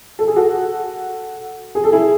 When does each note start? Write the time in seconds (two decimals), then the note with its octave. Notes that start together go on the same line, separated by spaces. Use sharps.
0.19 A4
0.27 G#4
0.36 F#4 A4
1.75 G#4
1.84 A4
1.92 E4 G#4